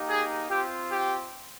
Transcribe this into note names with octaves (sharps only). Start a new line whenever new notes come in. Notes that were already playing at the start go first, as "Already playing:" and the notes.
Already playing: A#3 D#4 G4
G#4
C4 F4 G4
G4